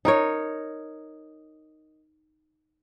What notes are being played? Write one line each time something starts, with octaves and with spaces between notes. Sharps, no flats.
D#4 A#4 C#5